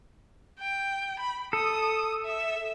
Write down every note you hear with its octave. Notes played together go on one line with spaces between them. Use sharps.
G5
B5
A4 D#6
E5